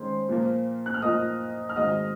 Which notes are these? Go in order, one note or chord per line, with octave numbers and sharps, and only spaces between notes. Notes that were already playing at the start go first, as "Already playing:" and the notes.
Already playing: D#3 G#3 C#4 C5 C#5 C6
A#2 F3 A#3
F#6
F6
A#2 F3 A#3 D#5 D#6
F6
G#2 D#3 G#3 C4 F#4 D#5 D#6